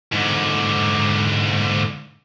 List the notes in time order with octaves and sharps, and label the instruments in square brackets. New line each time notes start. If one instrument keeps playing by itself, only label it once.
[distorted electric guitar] G#2 D3